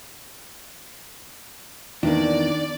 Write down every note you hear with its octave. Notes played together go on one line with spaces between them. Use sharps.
E2 D#3 A#3 D4 D5 D6